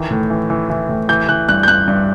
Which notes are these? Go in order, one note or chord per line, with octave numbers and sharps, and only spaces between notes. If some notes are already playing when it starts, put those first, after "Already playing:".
Already playing: D#3 E3
A2
E3
E3
E3
A2
E3 G6
E3 F#6
G2 F#6
G6
G2 F#6
G2